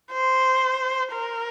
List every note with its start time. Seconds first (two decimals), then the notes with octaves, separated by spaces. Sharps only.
0.13 C5
1.13 A#4